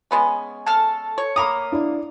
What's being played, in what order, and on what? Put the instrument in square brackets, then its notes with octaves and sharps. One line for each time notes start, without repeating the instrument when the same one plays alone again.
[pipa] G#3 B3 C#4
[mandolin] A4 A5 F6
[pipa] C#5
[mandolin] A#3 A#5 D#6 [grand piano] B5 D6
[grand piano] D4 E4